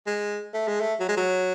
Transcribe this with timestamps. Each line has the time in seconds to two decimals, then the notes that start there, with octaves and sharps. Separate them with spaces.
0.06 G#3
0.54 A3
0.68 G#3
0.81 A3
1.00 F#3
1.09 G#3
1.17 F#3